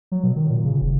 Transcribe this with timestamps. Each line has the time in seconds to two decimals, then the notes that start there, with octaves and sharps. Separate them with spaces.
0.12 F#3
0.24 B2
0.36 D#3
0.50 A#2
0.65 C#3
0.81 E1